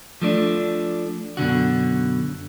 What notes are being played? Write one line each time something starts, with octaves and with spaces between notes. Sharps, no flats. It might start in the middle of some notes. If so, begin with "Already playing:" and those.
F3 A3 D4
F#2 B2 D3 F#4